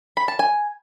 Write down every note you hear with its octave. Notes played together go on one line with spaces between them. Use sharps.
B5
A5
G#5